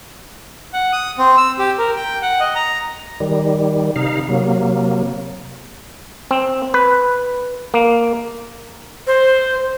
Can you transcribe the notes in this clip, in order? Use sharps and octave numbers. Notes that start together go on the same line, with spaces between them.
F#5
D#6
C4
E6
G4
A#4
G5
F#5
D#5
A#5
D#3 G3
C3 D#4 F5
C3 F#3 A#3
C4
B4
A#3
C5